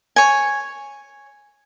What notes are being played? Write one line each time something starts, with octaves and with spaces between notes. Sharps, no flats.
C#5 G#5